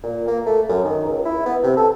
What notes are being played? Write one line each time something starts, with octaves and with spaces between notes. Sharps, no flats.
A#2
A#3
A3
F#2
D#3
C#2
E4
B3
C3
A4